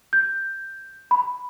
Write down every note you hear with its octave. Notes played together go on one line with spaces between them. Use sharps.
G6
B5